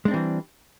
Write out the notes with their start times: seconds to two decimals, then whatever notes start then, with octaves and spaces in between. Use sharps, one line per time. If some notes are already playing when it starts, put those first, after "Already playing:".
0.05 G#3
0.08 D4
0.11 C4
0.14 E3
0.16 G3